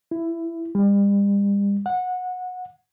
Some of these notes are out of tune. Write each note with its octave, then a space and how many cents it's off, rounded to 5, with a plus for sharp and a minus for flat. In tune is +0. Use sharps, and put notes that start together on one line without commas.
E4 +15
G3 +40
F#5 -20